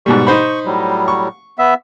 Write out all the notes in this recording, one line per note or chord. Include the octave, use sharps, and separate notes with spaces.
G#2 B2 G3 C#6
D#4 C5 B5
A2 F#3 G3
C#6
B3 E5